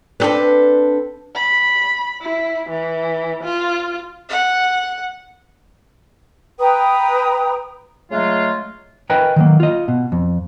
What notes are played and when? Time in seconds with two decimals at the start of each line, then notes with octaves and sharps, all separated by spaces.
0.20 B3 C4 D4 A4 B4
1.35 B5
2.21 E4
2.69 E3
3.43 F4
4.29 F#5
6.59 B4 G5 A#5 D#6
8.11 C#3 F#3 G#3 A3 F4
9.10 A#4 B4 D#5 G5 G#5 B5
9.36 D#3 F#3 A#3
9.60 F4 D#5
9.88 B2
10.12 F2